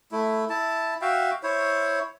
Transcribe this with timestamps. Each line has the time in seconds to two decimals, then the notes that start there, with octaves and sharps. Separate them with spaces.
0.12 A3 E4
0.50 E4 A5
1.01 F#4 E5 F5 G5
1.43 E4 C5 C#5